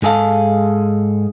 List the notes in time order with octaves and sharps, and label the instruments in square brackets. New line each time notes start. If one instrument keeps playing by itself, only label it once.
[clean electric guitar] G#2 G#3 G#4 A4 F5 A5